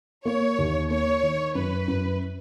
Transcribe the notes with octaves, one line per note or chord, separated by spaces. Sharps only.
A#3 C#5
D#2
A#3 C#5
D#3
F#2 B4
F#2